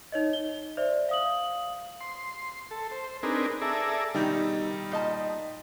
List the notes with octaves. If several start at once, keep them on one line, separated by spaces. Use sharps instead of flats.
D#4 C#5 D#5
G7
C5 D5 E5
F5 D#6 F#7
C6
A4
C5
C4 D4 D#4 G#4 A#4 B4
G#4 A4 D5 E5 A#5
B2 D#3 G3 D#4
A#2 D#5 A5